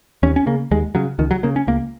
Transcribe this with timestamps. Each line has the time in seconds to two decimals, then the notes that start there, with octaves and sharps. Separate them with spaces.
0.23 D#2 C#4
0.36 C#4
0.46 C#3 A#3
0.71 D#2 G#3
0.95 C#3 F#3
1.19 C#2 D#3
1.31 F#3
1.43 C#3 A#3
1.56 C#4
1.67 C#2 A#3